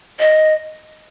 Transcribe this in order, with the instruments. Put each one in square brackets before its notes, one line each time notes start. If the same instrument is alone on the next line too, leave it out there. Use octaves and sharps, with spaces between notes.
[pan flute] D#5